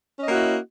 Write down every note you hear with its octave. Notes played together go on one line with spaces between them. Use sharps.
A#3 C#4 E4 F#4 D#5